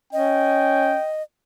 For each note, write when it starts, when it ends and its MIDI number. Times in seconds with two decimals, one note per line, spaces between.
0.13 0.95 61
0.13 1.23 75
0.13 1.11 79